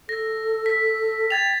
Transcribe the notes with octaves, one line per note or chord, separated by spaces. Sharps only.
A4 A#6
B6
G5 G#6 A6 F7